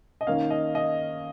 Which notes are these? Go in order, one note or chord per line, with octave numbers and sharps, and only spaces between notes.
D#5
D#3 A#3 C#4 F5
D#5
D#5